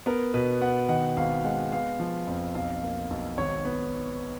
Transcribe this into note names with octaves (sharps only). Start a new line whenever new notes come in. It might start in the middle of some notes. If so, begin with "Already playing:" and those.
B3 A#4
B2 B4
B3 F#5
D#3 F#5
G#1 F5
G#3 F#5
B3 F5
F3
F2
B1 F5
A#3
B1
G#1 C#5
B3